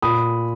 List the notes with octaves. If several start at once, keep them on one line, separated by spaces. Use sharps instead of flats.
A#2 B5 D#6